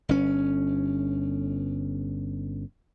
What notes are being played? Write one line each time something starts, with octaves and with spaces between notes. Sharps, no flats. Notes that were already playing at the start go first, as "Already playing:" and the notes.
G1 C#4